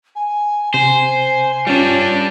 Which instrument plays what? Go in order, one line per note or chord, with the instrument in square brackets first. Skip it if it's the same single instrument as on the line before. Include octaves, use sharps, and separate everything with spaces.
[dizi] G#5
[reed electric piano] C3 [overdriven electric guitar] C5 [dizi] G#5
[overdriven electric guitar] G3 D4 [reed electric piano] C#4 F4